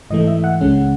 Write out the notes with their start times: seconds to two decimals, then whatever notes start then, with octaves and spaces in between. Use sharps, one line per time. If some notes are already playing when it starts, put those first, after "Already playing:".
0.10 G#2 E3 A3 D#5
0.27 E5
0.44 F#5
0.61 C#2 C#3 G#3 C#4